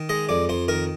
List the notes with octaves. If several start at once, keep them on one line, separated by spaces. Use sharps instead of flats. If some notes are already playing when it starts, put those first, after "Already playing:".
Already playing: D#3
G#3 D#5
F2 D5
F2 C5
D#3 A#4